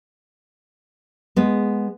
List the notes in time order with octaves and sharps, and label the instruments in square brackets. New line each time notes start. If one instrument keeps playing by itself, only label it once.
[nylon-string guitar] G#3 B3